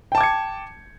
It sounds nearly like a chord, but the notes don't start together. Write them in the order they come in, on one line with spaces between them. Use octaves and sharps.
G5 A5 D6 G#6 C#7